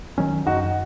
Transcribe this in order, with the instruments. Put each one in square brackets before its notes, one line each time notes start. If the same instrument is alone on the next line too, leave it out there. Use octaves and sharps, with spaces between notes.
[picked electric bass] D#3 F#3 C#4
[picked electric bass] F#2 [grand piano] D#4 F#4